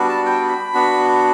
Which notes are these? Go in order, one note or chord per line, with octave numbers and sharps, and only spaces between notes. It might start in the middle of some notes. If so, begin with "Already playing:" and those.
Already playing: G3 B3 D4 F#4
A5
G5
B5
B3 D4 F#4